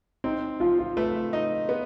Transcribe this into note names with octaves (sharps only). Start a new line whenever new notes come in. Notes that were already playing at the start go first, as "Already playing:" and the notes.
C4 D#4
F3 F4
F4
A3 B4
D#4
B3